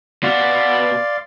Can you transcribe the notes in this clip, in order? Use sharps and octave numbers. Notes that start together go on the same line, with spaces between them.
B2 F#4 D5 F5 C6